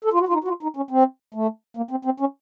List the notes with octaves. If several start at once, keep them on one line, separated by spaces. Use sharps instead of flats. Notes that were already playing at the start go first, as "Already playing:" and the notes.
A4
F4
F#4
F4
D#4
F#4
F4
D#4
C#4
C4
A3
A#3
C4
C4
C#4